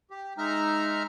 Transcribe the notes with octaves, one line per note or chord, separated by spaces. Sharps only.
G4
G#3 D#4 E5 A#5 F6